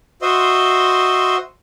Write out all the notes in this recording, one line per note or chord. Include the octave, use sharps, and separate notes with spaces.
F#4 C5 D#5 E5 C6